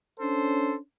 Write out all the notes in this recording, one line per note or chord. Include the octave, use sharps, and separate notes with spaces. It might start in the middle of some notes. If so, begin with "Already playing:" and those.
C#4 D4 A4 C5